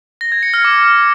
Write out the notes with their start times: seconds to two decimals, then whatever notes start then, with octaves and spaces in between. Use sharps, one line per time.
0.21 A#6
0.32 G#6
0.43 C#7
0.54 F6
0.64 D6